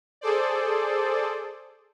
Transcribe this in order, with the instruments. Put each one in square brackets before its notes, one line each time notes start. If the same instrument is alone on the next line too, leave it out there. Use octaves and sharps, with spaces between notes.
[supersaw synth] G#4 A4 C5 D5